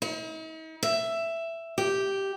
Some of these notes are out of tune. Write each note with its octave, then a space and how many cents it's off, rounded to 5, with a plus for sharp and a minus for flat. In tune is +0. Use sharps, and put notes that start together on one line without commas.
D#4 +45
E5 +10
G4 -5